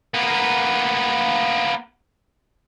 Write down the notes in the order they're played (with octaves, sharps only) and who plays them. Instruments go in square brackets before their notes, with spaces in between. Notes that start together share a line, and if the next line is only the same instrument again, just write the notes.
[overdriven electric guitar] A#3 B3